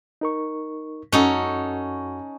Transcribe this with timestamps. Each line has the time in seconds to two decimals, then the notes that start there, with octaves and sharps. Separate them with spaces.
0.21 D#4 A#4 C#6
1.12 F#2 C#4 D#4 F#4 A4 F#5